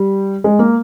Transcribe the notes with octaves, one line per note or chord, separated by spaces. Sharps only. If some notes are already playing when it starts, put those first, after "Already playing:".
Already playing: G3
G#3
A#3